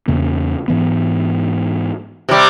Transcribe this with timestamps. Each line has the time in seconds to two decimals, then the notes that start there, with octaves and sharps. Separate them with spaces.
0.08 E2 C#3 A#3
0.68 G#2 E3 B3
2.29 C3 G3